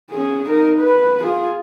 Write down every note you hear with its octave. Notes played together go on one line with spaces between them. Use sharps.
C#4 G#4
D#4 A#4
B4
F4 G#4